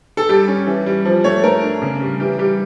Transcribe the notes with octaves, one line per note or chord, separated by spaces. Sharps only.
A4
G3 G4
C#4
E3
G3
F3
A3 C#5
A3 A#4
D4
C#3
G3
E3 G4
G3 G4